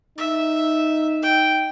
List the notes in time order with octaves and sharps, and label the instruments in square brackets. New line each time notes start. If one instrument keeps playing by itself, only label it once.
[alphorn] D#4 [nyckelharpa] E5
[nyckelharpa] G5